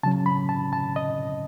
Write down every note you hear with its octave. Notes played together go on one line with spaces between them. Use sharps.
C#3 F#3 C#4 A5
B5
A5
A5
D#5